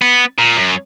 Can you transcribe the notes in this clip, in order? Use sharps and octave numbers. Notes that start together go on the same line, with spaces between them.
B3
A#2
F#2